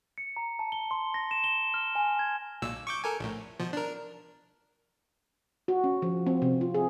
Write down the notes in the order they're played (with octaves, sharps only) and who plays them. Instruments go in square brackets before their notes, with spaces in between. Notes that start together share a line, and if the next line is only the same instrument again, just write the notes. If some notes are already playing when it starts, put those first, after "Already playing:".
[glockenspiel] C#7
A#5
A5
G7
C6
A#6
E7
G7
F6
G#5
G#6
[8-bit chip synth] B1 A#2 E6
C#6 D6 G6
A4 A#4 G#5
A#1 A2
B2 F3
D4 A#4
[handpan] F#4
C#4
F3
C4
C3
F4
G#4